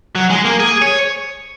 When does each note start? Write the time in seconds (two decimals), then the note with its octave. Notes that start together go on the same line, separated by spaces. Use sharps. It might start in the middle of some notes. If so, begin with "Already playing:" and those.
0.15 F#3
0.30 G#3
0.45 A#3
0.60 G#4
0.82 C#5